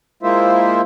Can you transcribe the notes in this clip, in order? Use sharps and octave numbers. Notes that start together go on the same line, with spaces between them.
G#3 A#3 E4 F4 C5 E5